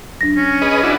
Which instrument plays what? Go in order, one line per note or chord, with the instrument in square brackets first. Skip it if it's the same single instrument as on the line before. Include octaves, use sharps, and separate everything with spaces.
[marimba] F#3 D4 [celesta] A#6
[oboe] C#4
[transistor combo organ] G#4 B4 D#5 [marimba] G#5
[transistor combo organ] D4 E4 F#4